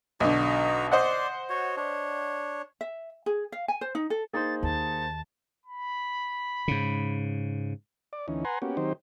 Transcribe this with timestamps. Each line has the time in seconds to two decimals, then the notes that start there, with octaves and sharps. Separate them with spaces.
0.20 B1 D3 D#4 F#4 A#5
0.92 C5 D5 D#5 F#5 C6
1.50 F#4 C#5
1.77 D4 C#5
2.81 E5
3.26 G#4
3.52 F5
3.68 G#5
3.81 C5
3.95 D#4
4.10 A4
4.34 A#3 D#4 G#4 C5 A6
4.63 D#2 A5
5.66 B5
6.68 G#2 C#3
8.13 D5
8.28 D2 E3 C#4 D#4
8.45 B4 F#5 G#5 A#5 C6
8.62 A#3 B3 C#4 F#4 G4
8.77 D#3 F#3 C4 D#4 G4 C5